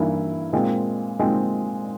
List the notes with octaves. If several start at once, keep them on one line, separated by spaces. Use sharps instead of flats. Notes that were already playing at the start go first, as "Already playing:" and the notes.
Already playing: G2 E3 A#3 E4
A#2 G#3 C4
A#2 G#3 C4